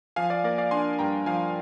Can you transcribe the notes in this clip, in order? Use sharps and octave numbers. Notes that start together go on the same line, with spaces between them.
F3 F5 G#5
D5 F5
A#3 A#4 D5
D5 F5
D4 G#5 C6
G2 G5 A#5
F3 F5 G#5